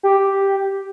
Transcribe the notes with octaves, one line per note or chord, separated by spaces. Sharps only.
G4